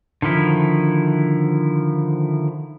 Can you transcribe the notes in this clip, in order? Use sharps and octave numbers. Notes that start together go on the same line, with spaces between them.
D3 D#3 F3 E4